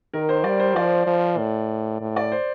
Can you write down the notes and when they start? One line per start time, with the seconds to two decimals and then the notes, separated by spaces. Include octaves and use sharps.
0.13 D#3 A#4
0.29 C5
0.44 G3 D5
0.60 C5
0.76 F3 D5
1.07 F3
1.38 A2
2.01 A2
2.16 D5
2.32 C5